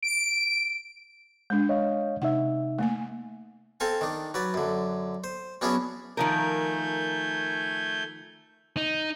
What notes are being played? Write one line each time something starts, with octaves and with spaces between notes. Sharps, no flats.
D7
G#3 D4 G6
C#5 D#5 F5
C3 D#4 E5 F#5
A3 A#3 G#5
C4 A4 F5 G#5
D#3 D4
F#3 B4 D5
F#2 D3
C5
F#3 B3 C#4 D4 E4 G#4
D#3 F3 A3 A#4 G#5 G6
D#4